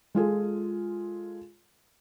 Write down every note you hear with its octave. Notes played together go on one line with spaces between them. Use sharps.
G#3 F4 G#4 A4